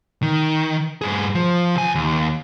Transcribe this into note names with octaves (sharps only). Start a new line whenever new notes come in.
D#3
G2 G#4
F3
C#2 G#5
D#2